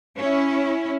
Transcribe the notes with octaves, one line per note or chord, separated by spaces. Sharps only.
C#4 E4